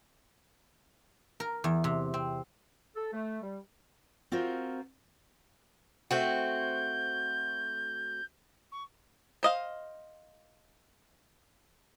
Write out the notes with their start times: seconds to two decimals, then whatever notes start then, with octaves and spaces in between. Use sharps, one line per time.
1.40 A#4
1.64 E2
1.84 C3
2.14 C4
2.96 A4
3.13 A3
3.42 G3
4.32 C4 F4 F#4 A#4 C5
6.11 A3 C4 F#4 G6
8.71 C#6
9.43 C5 D#5 F5